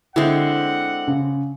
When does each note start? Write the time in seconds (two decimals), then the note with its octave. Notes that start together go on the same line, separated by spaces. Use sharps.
0.16 D3 G#3 C4 E4 F#5
1.07 C#3